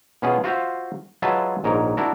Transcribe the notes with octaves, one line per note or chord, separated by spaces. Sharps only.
B2 B3 C#4 F4 G#4
F4 F#4 C5 E5 F5
F#3 G#3 F4 B4 E5 A5
A#1 G#2 A#4 C#5
D4 E4 F#4 A#4